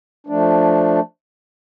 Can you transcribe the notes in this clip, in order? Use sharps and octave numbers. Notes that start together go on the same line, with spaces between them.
F3 A3 D4